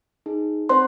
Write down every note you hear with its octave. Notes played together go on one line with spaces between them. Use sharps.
D#4 G#4
C4 C5 C6